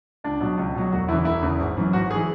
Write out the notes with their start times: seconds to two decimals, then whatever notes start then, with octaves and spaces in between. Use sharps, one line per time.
0.24 C#2 D4
0.40 B2 F#3
0.58 C#2
0.75 B2 F#3
0.92 E1 F#4
1.08 E2 C#3 E3 E4
1.25 E1 E4
1.42 E2 C#3 E3
1.59 G#1
1.77 F#2 E3
1.93 G#1 F#4
2.11 G#4
2.15 E3